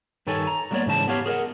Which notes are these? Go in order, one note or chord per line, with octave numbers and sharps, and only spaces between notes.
G2 D#3 A4 C#5 G#5
A#5
F#3 G3 A#3 B3 C#5 D5
G#2 C#3 E3 A5
B3 G4 C#5 F5
G#4 A#4 D#5 F#5